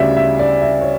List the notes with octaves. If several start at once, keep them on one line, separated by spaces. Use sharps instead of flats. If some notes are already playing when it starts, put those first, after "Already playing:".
Already playing: D2 C#3 G3 D5 E5
E5
D5
E5
C#5